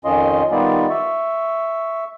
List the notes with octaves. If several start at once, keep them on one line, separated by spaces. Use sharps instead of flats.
F2 D#3 C#4 F4 D#5 C6
D#3 G3 B3 D#4 F4 D5
E5 C#6